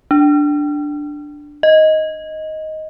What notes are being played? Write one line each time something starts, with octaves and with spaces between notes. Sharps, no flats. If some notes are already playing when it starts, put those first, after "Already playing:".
D4
D#5